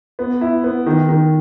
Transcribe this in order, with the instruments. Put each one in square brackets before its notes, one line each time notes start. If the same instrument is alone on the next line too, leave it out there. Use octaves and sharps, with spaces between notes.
[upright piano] B3
E4
B3
D#3
D#3